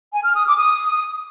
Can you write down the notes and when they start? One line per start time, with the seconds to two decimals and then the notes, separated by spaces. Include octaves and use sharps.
0.13 G#5
0.24 F6
0.36 D#6
0.47 D6
0.58 D#6